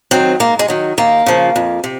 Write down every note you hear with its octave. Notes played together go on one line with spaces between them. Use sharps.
D#3 F#3 C4
G#2 A#3
G#3
D#3 F#3
D#2 A#3
C#3 F3
F2
C3